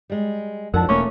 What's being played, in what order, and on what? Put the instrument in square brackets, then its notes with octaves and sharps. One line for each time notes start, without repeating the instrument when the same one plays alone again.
[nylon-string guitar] G3 G#3
[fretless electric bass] F2 F3 [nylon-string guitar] D4 F#4 F#5 [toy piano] D#4 A#4
[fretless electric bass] E1 A#3 [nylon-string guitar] A3 [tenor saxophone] C#4 [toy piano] C#6 D6